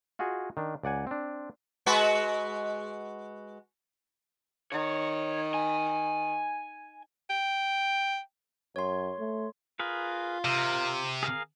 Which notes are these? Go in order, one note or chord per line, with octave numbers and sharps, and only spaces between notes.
F4 F#4 G#4 D#5
D#3 D4
C#2 D5 F#5 G#5
C4 D4
G#3 F#4 B4
D#3 C#5
G#5
G5
F#2 C#5 C6
A3
F4 G#4 A#4 B4
C3 A#4
G#4 A#4 F5